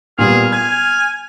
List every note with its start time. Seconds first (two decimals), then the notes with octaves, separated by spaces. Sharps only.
0.18 A#2 G3 B3 G#4 F6
0.52 G#5 G#6